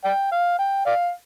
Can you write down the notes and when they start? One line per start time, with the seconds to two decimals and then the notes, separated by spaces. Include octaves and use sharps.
0.04 D5 G5
0.32 F5
0.58 G5
0.86 D5 F5